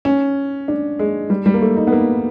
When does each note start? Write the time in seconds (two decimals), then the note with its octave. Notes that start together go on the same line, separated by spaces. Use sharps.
0.05 C#4
0.68 D4
0.99 G#3
1.30 G3
1.46 G3
1.54 A#3
1.62 A3
1.77 D#4
1.87 B3
1.92 A#3